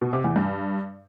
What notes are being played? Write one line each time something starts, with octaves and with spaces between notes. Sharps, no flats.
B2
C3
E2
G2